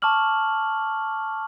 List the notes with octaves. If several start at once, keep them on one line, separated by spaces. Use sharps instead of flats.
A5 C#6 D6 F6 F#7